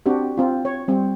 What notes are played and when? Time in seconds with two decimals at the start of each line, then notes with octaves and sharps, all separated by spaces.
0.06 C4 D4 F#4 G4
0.37 C4 F4
0.65 C#5
0.88 G3 C4